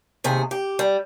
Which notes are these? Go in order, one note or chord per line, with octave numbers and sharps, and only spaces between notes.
D#2 C3 G#4
G4
G3